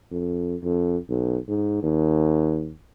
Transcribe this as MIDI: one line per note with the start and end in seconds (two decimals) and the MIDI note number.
0.11 0.55 41
0.63 0.97 41
1.09 1.38 35
1.48 1.82 44
1.83 2.74 39